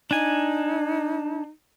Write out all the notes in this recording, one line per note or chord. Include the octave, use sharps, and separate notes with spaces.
D4 D#4 G#5